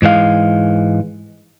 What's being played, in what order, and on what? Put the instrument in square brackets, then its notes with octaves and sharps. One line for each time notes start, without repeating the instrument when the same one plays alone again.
[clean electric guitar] G#2 E3 G#3 F5